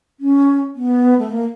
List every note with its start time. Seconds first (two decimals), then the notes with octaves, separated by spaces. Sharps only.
0.20 C#4
0.76 B3
1.19 A3
1.31 A#3